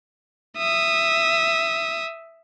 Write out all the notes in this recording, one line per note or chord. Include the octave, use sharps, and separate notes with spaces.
E5 D#6